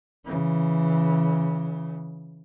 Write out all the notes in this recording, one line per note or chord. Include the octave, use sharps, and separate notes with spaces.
C#3 E3